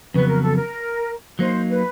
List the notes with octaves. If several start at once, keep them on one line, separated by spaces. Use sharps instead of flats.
F2 C#3 F#3 B3 B4
A#4
A4
A#4
F#3 A#3 D#4 C5
B4